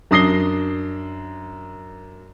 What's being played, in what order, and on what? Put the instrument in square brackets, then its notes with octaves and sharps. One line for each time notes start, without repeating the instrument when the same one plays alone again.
[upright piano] F#2 D4 D#6 A#6 C7 G7